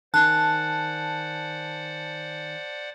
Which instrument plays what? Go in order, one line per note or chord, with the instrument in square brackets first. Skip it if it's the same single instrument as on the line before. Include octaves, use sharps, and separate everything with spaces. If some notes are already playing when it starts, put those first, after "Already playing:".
[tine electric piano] D#3 G#5 [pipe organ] C5 D5 F#5 [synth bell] A5 [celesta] F#6